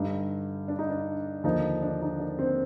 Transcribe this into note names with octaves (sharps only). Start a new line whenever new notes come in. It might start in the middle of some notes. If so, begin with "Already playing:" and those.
Already playing: G2 D3 G3 D#4
D4
D#4
D4
D#2 D3 F3 D#4
D4
D#4
D4
C4